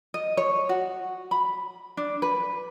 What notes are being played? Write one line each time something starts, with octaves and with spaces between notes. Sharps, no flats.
D#5
C#5
F#4
B5
D4
B4